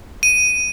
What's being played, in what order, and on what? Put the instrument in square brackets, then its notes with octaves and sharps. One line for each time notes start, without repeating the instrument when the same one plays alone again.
[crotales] D#7